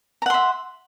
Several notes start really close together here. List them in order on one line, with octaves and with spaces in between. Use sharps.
A#5 F#5 C6 E5